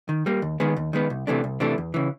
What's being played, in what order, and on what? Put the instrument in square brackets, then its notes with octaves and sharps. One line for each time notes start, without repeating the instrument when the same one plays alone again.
[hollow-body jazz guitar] D#3
G3 A#3
D#2
D#3 G#3 B3
D#2
D#3 G#3 B3
C2
C3 E3 A3 D4
C2
C3 E3 A3 D4
E2
C#3 E3